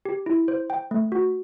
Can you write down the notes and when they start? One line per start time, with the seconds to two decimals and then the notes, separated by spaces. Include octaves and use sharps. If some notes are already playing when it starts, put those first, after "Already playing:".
0.05 G4
0.26 E4
0.48 C5
0.70 G5
0.91 A3
1.12 F#4